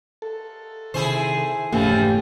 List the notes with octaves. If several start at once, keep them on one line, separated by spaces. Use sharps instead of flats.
A4
C3 D#3 E4 G#4 C5
F1 G#2 C#3 E3 F3 A3 A#3 G4